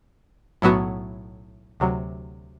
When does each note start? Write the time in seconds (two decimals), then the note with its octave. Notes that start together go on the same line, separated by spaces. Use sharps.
0.62 B1 A2 F#3 B3 F#4
1.80 D2 C3 F#3